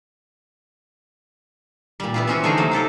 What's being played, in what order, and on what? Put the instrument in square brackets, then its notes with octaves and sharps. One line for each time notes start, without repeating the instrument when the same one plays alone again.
[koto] A#2 G3
B3 E4 F4
E3 C4 C#4 E4 F#4
D3 A3 D#4 G#4 F5 A#5
C3 F#3 A#3 C5
D#4 E4 A4 A#4